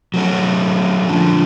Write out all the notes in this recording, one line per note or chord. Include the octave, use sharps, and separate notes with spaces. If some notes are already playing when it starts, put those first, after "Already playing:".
F#3 A3 C#4 F#4
F2 D3 F3